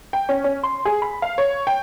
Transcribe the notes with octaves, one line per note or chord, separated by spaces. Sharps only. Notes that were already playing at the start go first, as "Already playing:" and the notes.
G5
C#4
C#4
C6
G#4
B5
F5
C#5
G5